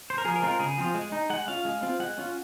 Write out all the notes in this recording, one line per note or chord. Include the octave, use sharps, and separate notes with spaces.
C5
A#4
F3 G#4
A#4
G#3 C4 F4
A#4
C#3 G#4
F3 C4 F4
G#3
D#4
G#3 F#5
C#4 F4 F5
G#3
C4 F4
G#3 F#5
C#4 F4